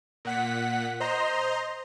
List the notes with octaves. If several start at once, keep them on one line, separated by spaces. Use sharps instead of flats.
A#2 F#5 B6
C5 D#5 A#5 C6